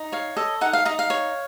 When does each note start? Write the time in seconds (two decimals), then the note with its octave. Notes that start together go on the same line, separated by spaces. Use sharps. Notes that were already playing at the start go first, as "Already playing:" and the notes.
Already playing: D#4
0.12 C#5 F5
0.37 A4 D#5
0.61 D#4 F#5
0.73 F5
0.85 D#4 D#5
0.99 F5
1.10 C#5